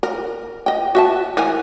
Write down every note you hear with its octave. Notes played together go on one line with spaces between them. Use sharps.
A#4
D#5 G5
F#4 E5 A5
E3 A#4 G#5